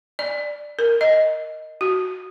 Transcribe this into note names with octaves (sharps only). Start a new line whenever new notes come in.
D5
A#4
D#5
F#4